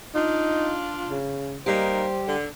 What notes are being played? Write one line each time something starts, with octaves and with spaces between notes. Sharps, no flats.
D4 D#4 F4
C#3
G3 A#3 D#4 G4 C5
D3